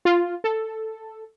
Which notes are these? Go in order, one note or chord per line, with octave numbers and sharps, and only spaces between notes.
F4
A4